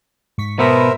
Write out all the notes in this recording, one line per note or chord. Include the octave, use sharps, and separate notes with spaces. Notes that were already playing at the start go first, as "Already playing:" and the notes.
G#2 C#6 B6
B2 B3 A#4 C5 E5